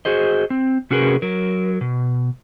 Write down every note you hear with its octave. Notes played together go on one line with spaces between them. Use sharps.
F#4 G#4 C5 D#5
C4
C3 C#4 F#4 G#4 A#4 B4
F#3 A#4
B2